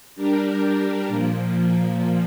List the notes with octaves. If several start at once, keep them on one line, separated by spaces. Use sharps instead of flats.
G3 D4 G4 A#4
A#2 F3 A#3